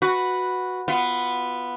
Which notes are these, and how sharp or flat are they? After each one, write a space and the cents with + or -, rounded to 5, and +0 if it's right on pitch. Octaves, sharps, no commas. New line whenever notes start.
F#4 -5 B4 +0
B3 +0 F4 -15